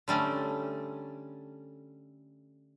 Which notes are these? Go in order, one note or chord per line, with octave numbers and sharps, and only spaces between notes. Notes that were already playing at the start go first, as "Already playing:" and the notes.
D3 G3 A3 C#4